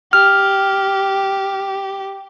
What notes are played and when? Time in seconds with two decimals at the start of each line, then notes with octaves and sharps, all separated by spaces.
0.13 G4 F6